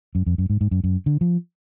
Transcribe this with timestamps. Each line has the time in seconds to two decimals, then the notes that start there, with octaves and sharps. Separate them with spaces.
0.15 F#2
0.26 F2
0.38 F#2
0.50 G#2
0.61 G#2
0.71 F#2
0.84 F#2
1.06 D3
1.21 F3